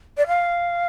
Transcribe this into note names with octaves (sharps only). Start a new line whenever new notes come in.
D5
F5